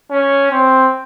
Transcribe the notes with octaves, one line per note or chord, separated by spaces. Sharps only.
C#4
C4